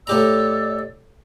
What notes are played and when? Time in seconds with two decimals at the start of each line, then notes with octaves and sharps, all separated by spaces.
0.07 A2 G4 D5 D#5 A#5 E6